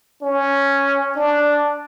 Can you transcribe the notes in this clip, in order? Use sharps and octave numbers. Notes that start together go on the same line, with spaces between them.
C#4
D4